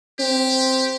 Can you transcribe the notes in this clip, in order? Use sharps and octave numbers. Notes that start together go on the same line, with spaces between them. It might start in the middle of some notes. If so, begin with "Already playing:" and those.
C4 G4